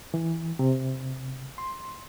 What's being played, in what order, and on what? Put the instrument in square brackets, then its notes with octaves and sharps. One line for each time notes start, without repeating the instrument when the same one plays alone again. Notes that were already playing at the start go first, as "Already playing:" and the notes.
[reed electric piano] E3
C3
C6